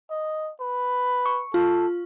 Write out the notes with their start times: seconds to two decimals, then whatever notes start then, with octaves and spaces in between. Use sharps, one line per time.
0.10 D#5
0.60 B4
1.26 C#6
1.54 F4 A4